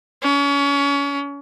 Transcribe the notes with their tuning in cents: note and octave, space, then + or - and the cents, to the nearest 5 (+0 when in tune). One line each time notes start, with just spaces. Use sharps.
C#4 +30